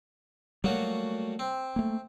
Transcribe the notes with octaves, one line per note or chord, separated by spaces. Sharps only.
F#3 G3 A3 A#3 F#4
C4
A3 A#3